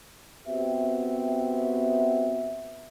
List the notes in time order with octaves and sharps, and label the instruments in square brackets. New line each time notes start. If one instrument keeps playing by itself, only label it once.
[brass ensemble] B3 C4 F#4 G4 E5